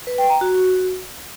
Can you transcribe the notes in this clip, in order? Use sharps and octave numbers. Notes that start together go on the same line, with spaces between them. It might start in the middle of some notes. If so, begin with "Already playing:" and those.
B4
G5
A#5
F#4